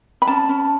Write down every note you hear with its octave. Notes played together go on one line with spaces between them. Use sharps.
B5
C#4 A5
C#4